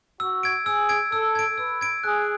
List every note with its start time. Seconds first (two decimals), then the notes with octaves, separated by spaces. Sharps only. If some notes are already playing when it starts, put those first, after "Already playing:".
0.20 F#4 E6
0.43 G#6 D7
0.66 G#4 E6
0.89 G#6 D7
1.12 A4 E6
1.35 G#6 D7
1.58 B4 E6
1.81 G#6 D7
2.04 G#4 F#6